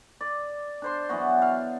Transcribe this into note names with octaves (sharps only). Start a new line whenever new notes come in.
D5
D4 C5 C6
E3 F#3 B3 F#4
F5